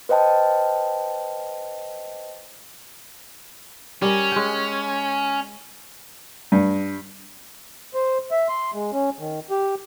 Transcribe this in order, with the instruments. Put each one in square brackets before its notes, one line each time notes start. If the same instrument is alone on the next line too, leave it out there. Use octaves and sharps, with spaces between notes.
[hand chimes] B4 C5 D#5 G5 A5
[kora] G3 A#4 [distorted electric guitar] C#4
[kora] G#3 G5
[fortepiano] G2
[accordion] C5
E5
C6
G#3
C#4
D#3
G4